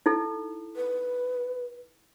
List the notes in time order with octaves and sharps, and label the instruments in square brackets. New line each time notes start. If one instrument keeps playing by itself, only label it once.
[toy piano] D#4 E4 A4
[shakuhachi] B4